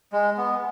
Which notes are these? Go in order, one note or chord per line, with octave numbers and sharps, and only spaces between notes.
G#3
B3